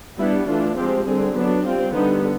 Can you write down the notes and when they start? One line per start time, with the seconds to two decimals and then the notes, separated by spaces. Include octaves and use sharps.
0.19 G3 B3 D4 E4
0.48 E3 A3 D4 F4
0.76 F3 G#3 C4 G4
1.06 D3 G3 C4 G#4
1.35 F#3 B3 D4
1.65 G3 C4 F4
1.94 D3 G3 B3 D#4